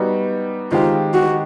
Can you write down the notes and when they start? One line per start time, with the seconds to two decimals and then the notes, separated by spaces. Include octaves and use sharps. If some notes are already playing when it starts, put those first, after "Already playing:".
Already playing: G3 B3 D#4 F#4
0.71 D#3 G#3 C4 D#4 F4 G4
1.14 F#4